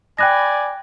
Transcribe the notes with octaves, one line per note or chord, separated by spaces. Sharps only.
D5 G5 G#5 B5 F#6 A#6